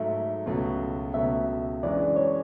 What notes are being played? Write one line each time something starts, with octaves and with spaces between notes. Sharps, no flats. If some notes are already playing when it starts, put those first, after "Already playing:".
Already playing: G#2 F#3 A3 E5
C#2 B2 F#3 A3
C#2 B2 F#3 A3 E5
F#2 E3 G#3 D4 D5
C#5